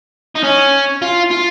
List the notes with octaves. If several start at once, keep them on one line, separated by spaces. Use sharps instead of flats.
D#4
C#4
F4
F4